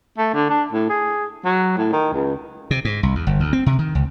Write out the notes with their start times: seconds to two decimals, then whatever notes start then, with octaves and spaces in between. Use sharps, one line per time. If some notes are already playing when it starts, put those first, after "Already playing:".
0.18 A3
0.34 D3
0.49 D4
0.72 A2
0.89 G#4
1.45 F#3
1.78 A2
1.93 D#3
2.13 C#2
2.71 C3
2.85 G#2
3.03 C2
3.15 E2
3.27 G1
3.40 D2
3.53 C4
3.66 C3
3.79 D#3
3.95 C#2